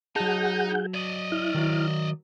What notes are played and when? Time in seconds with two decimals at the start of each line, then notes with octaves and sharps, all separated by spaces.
0.16 F#3 D#4 G#4 F#5 A5 G6
0.95 D5 D#5
1.32 E4 F6
1.54 D#3 F#3